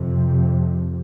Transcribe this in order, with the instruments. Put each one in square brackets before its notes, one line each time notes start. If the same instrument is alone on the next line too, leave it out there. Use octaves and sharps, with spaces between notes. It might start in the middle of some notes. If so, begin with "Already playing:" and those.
Already playing: [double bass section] F2 C3